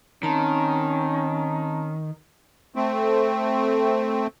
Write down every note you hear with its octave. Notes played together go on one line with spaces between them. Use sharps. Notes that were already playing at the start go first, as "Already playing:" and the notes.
D#3 C4 C#4 A5 A#5
A3 C4